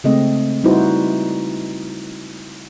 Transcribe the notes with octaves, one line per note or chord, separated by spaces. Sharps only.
C#3 G#3 A3 C4 D#5
G3 D#4 E4 F#4 B4 C5